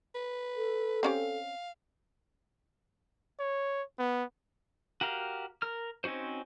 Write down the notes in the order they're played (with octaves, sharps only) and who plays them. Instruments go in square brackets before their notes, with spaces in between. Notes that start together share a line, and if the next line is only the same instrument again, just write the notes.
[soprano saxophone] B4
[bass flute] A4
[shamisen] C4 C#4 G4 [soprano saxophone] F5
[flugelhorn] C#5
B3
[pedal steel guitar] F#4 G4 A#4 F5
A#4 F6
C4 C#4 D#4 F#4 C5